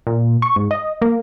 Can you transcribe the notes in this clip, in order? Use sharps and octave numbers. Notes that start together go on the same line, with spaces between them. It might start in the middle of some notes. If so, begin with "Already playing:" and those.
A#2
C#6
G#2
D#5
A#3